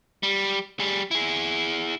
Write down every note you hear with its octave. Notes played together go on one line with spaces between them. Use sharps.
G3
G3 G#4
E4 G#4